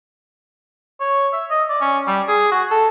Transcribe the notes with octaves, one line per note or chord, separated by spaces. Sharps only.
C#5
E5
D#5
D5
C#4
G3
G#4
F#4
A4